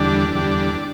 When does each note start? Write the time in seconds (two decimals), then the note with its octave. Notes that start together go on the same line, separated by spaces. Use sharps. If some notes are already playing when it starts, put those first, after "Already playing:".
Already playing: E2 D3 G3 D4
0.35 E2 D3 G3